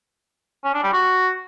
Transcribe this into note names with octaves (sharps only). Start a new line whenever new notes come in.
C#4
D4
G3
F#4